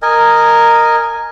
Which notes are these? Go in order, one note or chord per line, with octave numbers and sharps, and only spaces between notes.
A#4 D#5 G#5